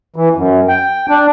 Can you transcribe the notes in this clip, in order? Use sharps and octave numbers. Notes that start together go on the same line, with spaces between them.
E3
F#2
G5
D4